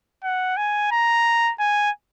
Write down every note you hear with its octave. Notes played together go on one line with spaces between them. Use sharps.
F#5
G#5
A#5
G#5